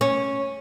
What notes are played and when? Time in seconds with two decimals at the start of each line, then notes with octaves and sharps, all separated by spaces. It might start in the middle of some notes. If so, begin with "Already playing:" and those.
0.01 C#4